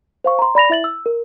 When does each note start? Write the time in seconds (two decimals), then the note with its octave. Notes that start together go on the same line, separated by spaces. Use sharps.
0.24 C5 F5 C#6
0.39 A#5 C6
0.55 D5 B5 A#6 F7
0.69 E4 E5 A6 F#7
0.84 E6
1.06 A#4